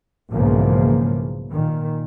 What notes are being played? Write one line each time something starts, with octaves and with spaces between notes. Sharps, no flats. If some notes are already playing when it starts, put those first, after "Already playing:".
B1 G#2 C#3 E3 F3 A#3
A#2 D#3